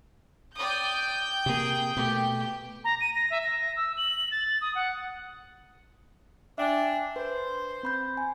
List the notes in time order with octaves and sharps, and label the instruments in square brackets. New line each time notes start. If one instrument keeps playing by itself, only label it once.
[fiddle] D5 D#6 [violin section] G5 G6
[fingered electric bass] C3 A#3 [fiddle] G#4
[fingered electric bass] B2 A3 [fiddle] G4
[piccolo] A#5
D#7
A#6
E5
A#6
E6
F#7
A6
D#6
F#5
[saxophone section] D4 [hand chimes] E5 G5 G#5
[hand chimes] B4 [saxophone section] C5
[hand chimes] C4 B5 G6
G#5